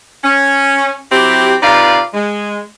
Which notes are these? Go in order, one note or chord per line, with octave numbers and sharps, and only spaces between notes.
C#4
F#3 C4 E4 G4
C3 D#4 F4 B4 D5 F5
G#3